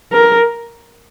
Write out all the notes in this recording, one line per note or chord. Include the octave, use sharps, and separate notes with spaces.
A#4